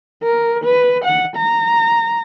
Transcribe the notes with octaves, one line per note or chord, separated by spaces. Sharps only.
A#4
B4
F#5
A#5